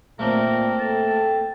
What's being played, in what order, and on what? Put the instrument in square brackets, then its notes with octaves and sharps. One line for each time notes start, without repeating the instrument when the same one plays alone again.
[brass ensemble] A#2 [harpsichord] A3 A#3 C4 [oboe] A#4
[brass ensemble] A4 G5 [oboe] A5